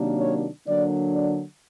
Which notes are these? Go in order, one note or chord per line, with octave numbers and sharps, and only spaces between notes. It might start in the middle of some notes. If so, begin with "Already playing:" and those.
Already playing: C3 D#3 F#3 A#3 D4
C#5
D3 F#3 A#3 D4 D5
D5